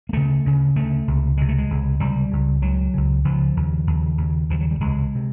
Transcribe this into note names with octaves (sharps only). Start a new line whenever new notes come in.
A#3
D2 C#3 A3
D2 C#3
D2 C#3 A3
C#2 C3
C#2 C3 G#3
A3
G#3
C#2 C3
C#2 C3 G3
C#2 C#3
C#2 F#3
C#3
C#2 C#3
C#2 C#3 F3
D#2 C#3
D#2 C#3
D#2 C#3
D#2 C#3 F3
F#3
G3
C#2 C3 G#3
C3